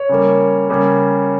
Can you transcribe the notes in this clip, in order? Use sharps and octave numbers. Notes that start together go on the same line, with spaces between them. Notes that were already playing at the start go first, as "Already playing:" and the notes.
Already playing: C#5
C#3 G3 A#3
C#3 G3 A#3